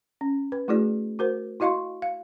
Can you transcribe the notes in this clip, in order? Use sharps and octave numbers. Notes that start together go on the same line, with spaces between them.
C#4
B4
A3 E4 F#4 G#4 D5
F#4 A#4 C5
E4 F#4 D#5 F5 C6 C#6
F5